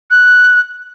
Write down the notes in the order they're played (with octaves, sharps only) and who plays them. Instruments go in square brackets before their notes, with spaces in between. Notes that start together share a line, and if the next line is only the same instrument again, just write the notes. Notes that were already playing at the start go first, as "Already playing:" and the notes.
[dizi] F#6